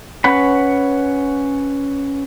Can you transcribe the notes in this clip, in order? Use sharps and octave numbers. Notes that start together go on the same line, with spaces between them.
C#4 B4 C#5 F#5 B5